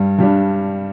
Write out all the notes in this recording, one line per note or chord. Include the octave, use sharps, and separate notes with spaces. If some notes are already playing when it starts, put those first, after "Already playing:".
Already playing: G2 G3
G2 G3 D4